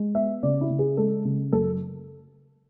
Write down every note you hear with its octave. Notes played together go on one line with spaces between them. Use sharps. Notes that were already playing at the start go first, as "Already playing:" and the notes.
Already playing: G#3
B3 E5
C#3 D5
E4
C#3
G#4
G#3 A4
C#3
F#2 A4